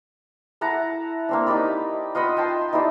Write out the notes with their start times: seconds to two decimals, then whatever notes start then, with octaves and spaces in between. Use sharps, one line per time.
0.61 E4 F#5 A5 A#5
1.29 A#3 C4 D4
1.47 D#4 G4 D5 B5
2.15 F4 D#5 F#5 B5
2.37 G5 A5 C6
2.73 D#4 E4 G4 D5